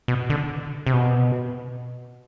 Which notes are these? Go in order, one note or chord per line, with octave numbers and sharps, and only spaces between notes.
B2
D3
C3
B2